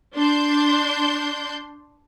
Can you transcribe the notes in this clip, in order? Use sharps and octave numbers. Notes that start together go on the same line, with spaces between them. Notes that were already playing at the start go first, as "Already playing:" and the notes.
D4 C6 G6